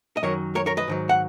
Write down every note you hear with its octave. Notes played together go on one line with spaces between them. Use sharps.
D#5
F#2 D#3 F#3 A#4 C#5
A#4 C#5
A#4 C#5
B4 D#5
G#2 D#3 F#3
F#5